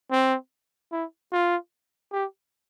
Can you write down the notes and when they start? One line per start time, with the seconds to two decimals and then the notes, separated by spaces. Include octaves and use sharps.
0.11 C4
0.92 E4
1.32 F4
2.12 G4